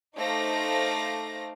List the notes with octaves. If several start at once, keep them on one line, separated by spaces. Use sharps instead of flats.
A3 D#4 C5 F5 D6 A#6